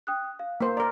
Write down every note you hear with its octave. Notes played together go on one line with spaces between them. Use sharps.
G5 D#6 F#6
F5
A#3 C5
A#4 D5 A#5